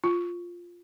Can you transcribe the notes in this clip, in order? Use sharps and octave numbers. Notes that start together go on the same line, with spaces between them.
F4